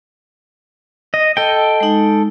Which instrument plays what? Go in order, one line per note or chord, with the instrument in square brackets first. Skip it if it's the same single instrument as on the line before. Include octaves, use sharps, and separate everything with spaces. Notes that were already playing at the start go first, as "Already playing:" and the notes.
[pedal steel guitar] D#5
[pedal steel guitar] A4 G5 [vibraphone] D#5
[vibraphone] G#3 D#4